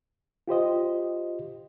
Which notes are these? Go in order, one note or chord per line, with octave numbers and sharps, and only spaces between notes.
F4 G4 C5 D#5